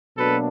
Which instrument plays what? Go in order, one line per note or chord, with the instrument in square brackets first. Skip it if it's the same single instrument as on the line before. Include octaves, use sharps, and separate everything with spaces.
[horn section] B2 F#3 A#3 D4 A4 B4